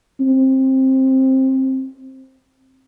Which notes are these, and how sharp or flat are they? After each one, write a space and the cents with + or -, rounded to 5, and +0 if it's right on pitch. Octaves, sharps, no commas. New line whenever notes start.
C4 +15